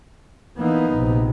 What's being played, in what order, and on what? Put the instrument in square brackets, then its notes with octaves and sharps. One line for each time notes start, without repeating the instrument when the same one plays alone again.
[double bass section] E3 A#3 [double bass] B3 D#4
[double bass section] A#1 C3